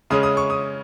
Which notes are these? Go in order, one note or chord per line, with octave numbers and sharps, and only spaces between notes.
C#3 G#3 C#4 D#6
D#6
C#6
D#6